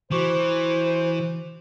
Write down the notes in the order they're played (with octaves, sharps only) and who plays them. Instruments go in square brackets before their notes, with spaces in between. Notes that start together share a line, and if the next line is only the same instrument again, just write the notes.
[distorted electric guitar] E3 [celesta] F#4 C#6 D6 [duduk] C5